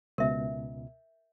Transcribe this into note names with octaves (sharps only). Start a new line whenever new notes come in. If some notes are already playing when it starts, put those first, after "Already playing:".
C#2 B2 A#4 E5